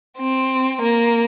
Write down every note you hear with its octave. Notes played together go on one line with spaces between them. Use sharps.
C4
A#3